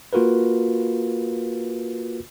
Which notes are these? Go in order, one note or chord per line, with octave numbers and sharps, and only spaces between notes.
A#3 F4 F#4 A#4 B4